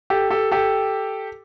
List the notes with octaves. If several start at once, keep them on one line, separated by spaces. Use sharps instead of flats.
G4 A4
G4 A4
G4 A4